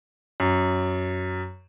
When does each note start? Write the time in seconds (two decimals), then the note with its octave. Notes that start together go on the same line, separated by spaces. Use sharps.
0.40 F#2